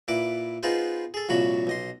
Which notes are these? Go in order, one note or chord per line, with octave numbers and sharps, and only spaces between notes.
A#2 E4 B4 D6
B3 D#4 F4 G#4 B4 C5
G#4 A4
C2 F2 A#2 F#4 C#5 B5
B1 D#5 C6